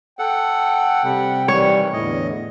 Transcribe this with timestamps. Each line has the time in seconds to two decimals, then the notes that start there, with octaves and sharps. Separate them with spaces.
0.19 A4 F#5 G5
1.04 C3 G3 F#5
1.48 D#3 E3 G3 C#5
1.93 E2 A2 D3 D#5